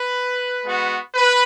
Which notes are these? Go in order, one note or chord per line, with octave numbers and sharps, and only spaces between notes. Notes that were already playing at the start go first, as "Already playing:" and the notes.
Already playing: B4
G#3 B3 F#4
B4